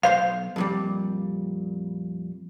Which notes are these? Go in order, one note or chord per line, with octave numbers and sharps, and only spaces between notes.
B1 C5 F5 C6
F2 A#2 G3